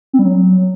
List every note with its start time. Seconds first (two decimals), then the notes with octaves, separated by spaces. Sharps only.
0.13 C4
0.19 G3
0.25 F#3